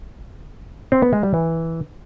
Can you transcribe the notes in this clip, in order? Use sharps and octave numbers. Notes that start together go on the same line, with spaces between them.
C4
B3
G#3
G3
E3